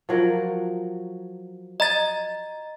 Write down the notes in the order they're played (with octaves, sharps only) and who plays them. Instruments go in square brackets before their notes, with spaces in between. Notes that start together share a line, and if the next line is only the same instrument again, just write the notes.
[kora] F3 F#3 A#4
[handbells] D#5 A#5 A6